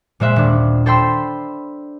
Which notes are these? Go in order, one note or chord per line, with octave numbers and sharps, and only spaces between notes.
A#2 G#3 C5 E5 F#6
D#1 D4
A4 C5 G5 B5 C6 E6